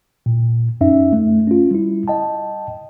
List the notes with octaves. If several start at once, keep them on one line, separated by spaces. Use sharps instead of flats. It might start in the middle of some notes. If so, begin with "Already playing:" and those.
A#2
F#2 C#4 D#4 E5
A3
C#4 F4
G3 E4
D#5 G5 A5